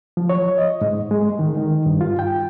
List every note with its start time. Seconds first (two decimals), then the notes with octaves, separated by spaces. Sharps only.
0.17 F3
0.29 C#5
0.58 D#5
0.81 G#2
1.11 G#3
1.39 D#3
1.57 D#3
1.86 G2
2.01 F4
2.19 G5